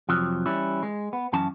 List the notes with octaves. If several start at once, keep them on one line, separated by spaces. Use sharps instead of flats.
F2 C3 F3 F#3
E3 G3 C#4 E4
G#3
B3
F#2 E3 C#4 A5